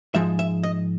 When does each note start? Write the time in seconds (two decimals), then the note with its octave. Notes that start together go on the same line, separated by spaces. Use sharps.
0.15 G#2 F3 G#3 E5
0.39 E5
0.63 D#5